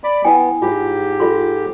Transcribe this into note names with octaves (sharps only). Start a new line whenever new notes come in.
D5 B5
B3 E4 G5 G#5
G#2 F4 G4
F4 A4 C6